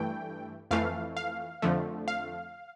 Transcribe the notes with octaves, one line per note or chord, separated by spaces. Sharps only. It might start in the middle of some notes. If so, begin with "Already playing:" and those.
Already playing: G2 E3 A3 G5
F2 E3 A3 F5
F5
F2 D3 F3 A3
F5